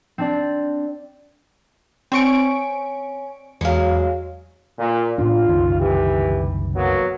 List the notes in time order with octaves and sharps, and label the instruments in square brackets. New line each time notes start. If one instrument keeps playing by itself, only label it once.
[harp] C4 D4 D5
[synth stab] C4 C#6 D7 [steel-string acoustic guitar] C#4
[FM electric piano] E2 F5 [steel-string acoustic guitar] F#3 G#3
[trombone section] A#2
[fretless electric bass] A2 B3 D4 [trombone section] F4
[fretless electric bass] F#1 C2 D#3
[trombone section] E3 G4
F#3 A#3 B3